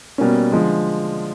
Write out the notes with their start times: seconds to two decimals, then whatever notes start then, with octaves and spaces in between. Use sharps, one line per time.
0.18 B2 G3 A#3 C#4
0.52 D3 F3 G#3